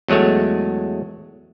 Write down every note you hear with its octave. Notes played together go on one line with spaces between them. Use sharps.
E2 F#3 G#3 A3 C#5